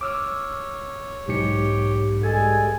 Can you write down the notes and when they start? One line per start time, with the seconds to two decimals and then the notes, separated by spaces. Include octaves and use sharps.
0.01 C#5 D6 E6 F6
1.28 B1 G#2 G4 C#7
2.23 G2 G#3 G#4 A4 G#5